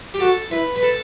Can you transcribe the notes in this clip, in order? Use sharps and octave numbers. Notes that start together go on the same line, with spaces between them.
G4
F#4 A4
E4 B4
B4
A4